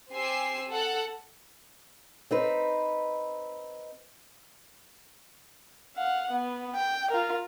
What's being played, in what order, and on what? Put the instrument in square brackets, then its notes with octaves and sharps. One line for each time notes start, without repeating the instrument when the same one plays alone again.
[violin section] C4 G4 G#5 E6 C7
A4 F#5 F#6
[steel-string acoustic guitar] C4 D#4 B4
[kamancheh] F5 F#5
B3
G5
F4 A#4